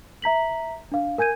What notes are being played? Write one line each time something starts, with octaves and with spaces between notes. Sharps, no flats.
E5 A#5 B6 F#7
D4 F5
A#4 G#5 G6 G#6 D#7